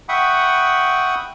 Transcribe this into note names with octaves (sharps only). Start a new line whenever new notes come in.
E5 F#5 G5 B5 C#6 D#6